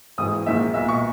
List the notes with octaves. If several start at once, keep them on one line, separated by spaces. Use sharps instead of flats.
G#1 G#2 E3 D#6
A#1 G#2 D#3 E5
B1 A#2 E5
C#6